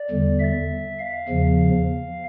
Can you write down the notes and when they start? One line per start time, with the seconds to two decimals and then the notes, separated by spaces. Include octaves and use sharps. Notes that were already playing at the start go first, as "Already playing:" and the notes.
Already playing: D5
0.10 E2 D3 G3
0.40 E5
0.99 F5
1.29 E2 C#3 F3